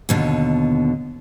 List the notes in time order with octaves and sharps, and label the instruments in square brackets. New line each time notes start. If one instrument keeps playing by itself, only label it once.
[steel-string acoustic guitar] D#2 B2 D3